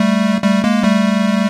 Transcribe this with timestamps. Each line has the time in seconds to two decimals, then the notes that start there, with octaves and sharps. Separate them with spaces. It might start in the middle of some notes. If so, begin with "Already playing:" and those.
Already playing: G3 A3
0.42 G3 A3
0.64 G#3 A#3
0.83 G3 A3